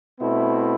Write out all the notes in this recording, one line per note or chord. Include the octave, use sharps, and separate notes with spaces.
B2 A3 C4 E4